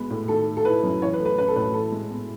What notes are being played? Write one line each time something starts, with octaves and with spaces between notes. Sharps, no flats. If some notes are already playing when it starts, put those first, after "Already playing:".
Already playing: G#3 B3
A2
D#3 A4
A3
A4
E4 B4
F#2
E3 C#5
B4
A3
B4
C#4 B4
A4
A2 B4
E3 A4
G#3
B3